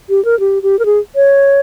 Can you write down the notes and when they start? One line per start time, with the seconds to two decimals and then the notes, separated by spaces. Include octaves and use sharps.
0.09 G4
0.25 A#4
0.40 G4
0.63 G4
0.79 A#4
0.85 G#4
1.15 C#5